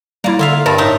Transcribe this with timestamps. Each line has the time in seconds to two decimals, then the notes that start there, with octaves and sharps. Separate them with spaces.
0.24 G3 A#3 E4 D5
0.39 D3 F4 E5 F5
0.66 G2 G3 A#4 D5 A5
0.78 A2 D#4 E5